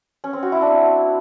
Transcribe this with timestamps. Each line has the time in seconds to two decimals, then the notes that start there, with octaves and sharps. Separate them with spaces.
0.24 C#4
0.33 C4
0.43 F#4
0.52 E4
0.62 D4